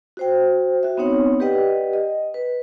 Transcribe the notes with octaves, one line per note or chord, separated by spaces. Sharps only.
F#4 C5 G5
F#4 E5
B3 C4 D#4 C#5 F#5
G4 B4 D5 D#5 F#5 G5
D#5
B4